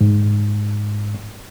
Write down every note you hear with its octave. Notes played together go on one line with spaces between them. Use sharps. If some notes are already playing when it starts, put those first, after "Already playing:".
G#2